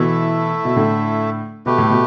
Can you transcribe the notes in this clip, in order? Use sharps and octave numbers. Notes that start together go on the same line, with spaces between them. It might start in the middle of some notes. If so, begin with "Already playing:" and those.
Already playing: B2 E3 A3 E4 A4 E5
B2
A2 D3
B2 A3 G4 B4
A2
B2